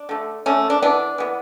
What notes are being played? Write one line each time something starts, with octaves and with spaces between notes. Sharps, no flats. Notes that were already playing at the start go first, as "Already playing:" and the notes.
Already playing: D4
D3 A3
D3 A3 C#4
D4
E3 B3 D4
E3 B3